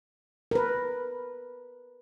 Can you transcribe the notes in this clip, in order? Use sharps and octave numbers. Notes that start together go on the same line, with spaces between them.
A#4 B4